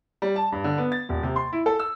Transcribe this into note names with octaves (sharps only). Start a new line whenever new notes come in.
G3
A5
G2
D3
B3
A6
D#1
C3
C6
E4
A4
E6